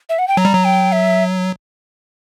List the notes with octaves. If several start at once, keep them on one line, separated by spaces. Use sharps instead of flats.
E5
F#5
G5
F#3 A#5
G3
F#3
G5
E5